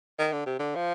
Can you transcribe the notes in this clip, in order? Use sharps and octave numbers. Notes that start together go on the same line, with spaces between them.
D#3
D3
C3
D3
F3